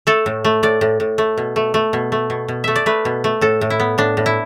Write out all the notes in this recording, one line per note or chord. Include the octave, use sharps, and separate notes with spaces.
A3 A4
A2
A3
A2 D5
A2
A2
A3
B2
A3
A3
B2
A3
B2
B2
A3 E5
D5
A3 B4
B2
A3
A2 A4
A2
E4
B3
A2 D4
A2
E4